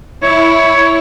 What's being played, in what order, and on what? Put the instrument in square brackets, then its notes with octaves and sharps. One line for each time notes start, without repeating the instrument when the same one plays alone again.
[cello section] E4 [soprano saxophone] C#5